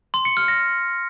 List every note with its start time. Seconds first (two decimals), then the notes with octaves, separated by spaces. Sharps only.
0.14 C6
0.25 C#7
0.37 F6
0.48 A#6